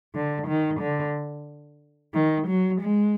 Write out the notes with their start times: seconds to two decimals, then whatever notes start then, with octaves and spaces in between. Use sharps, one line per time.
0.15 D3
0.48 D#3
0.81 D3
2.15 D#3
2.48 F#3
2.81 G#3